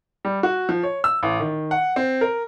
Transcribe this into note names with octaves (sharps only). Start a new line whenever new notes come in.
G3
F#4
F3
C#5
E6
A1
D#3
F#5
C4
A#4